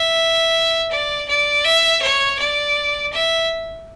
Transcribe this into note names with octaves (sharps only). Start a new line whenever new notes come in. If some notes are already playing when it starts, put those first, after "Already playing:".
Already playing: E5
D5
D5
E5
C#5
D5
E5